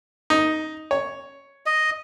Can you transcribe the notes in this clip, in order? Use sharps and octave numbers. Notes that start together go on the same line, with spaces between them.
D#4
C#5
D#5